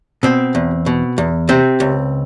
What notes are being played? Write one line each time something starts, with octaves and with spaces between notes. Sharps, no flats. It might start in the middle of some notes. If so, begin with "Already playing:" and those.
B2 C4
E2
B2
E2
C3 C4
C#2